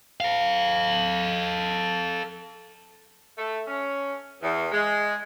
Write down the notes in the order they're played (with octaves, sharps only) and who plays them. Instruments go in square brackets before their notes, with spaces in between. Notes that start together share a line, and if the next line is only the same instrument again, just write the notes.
[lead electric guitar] A4 F5
[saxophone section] A3
C#4
E2
G#3